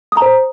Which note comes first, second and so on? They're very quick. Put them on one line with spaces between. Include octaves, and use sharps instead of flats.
D#6 A#5 C5